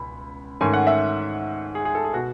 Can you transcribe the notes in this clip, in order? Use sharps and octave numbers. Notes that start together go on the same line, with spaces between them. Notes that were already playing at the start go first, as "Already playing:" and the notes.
Already playing: C#2 B2 B5
G#2 D#3 A3 C#4 G#5
F#5
E5
G#4
G#4
A4
G#4
B2 F#4